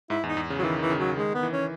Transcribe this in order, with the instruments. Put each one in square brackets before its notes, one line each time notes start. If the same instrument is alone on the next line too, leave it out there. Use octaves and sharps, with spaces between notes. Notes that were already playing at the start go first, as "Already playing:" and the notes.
[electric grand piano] G#2 [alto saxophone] E4
[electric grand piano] E2
[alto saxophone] D#4
[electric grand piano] E2
C#3
[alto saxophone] F#3
[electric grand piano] D#3 [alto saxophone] E3
[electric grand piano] D#3 [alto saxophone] E3
[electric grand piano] C#3
[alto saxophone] F#3
[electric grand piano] D#3 [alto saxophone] G#3
[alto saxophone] B3
[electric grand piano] E3
[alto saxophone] C#4